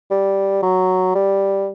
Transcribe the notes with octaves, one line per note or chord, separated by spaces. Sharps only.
G3
F#3
G3